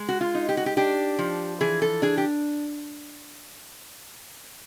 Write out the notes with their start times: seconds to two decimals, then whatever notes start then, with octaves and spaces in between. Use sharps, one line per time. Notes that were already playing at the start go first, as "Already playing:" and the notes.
Already playing: G#3
0.09 F#4
0.21 F4
0.35 D#4
0.49 G4
0.57 F#4
0.66 G4
0.77 D4 G4
1.19 F3
1.61 E3 G#4
1.82 A4
2.02 D4 G#4
2.17 G4